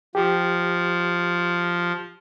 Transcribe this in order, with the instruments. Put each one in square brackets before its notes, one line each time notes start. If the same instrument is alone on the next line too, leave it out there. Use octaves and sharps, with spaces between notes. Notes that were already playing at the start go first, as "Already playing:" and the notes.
[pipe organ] F3 [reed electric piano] G4